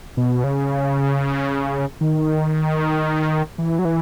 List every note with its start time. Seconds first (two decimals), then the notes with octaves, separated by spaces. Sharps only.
0.17 B2
0.44 C#3
2.01 D#3
3.58 E3
3.79 F#3
3.85 E3